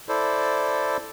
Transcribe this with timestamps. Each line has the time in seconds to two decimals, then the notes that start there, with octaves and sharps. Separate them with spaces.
0.09 E4 A4 C5 D5